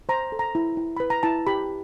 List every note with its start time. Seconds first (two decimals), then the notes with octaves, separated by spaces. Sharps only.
0.09 C5 A#5
0.32 A4
0.39 A#5
0.55 E4
0.77 E4
0.97 B4 B5
1.10 A#5
1.23 E4 A5
1.47 G4 B5